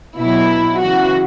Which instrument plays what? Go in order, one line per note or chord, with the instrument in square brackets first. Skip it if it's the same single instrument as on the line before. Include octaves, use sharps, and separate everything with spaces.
[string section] B2 F#3 E4
C#3 E3 F#4